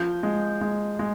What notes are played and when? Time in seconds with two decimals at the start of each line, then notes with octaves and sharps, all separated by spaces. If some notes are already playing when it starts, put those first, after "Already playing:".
Already playing: F3 G6
0.23 G#3
0.61 G#3
0.99 G#3